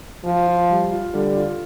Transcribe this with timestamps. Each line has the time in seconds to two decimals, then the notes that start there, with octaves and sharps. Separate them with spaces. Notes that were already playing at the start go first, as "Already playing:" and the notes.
0.25 F3 F4
0.47 F4
0.70 G3
0.91 F4
1.14 D3 G3
1.36 F4